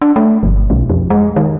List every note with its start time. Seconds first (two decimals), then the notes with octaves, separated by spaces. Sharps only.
0.02 D4
0.16 A3
0.43 G1
0.70 B1
0.90 F2
1.10 G#3
1.36 D#3